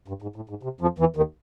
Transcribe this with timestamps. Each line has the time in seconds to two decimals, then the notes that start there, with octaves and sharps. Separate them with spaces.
0.08 G2
0.22 G#2
0.36 A2
0.49 G#2
0.63 C3
0.81 F2 F3
0.99 E2 E3
1.16 D#2 D#3